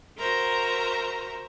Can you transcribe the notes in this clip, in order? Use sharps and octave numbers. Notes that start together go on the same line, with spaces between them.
F#4 A#4 C5 E5 A#5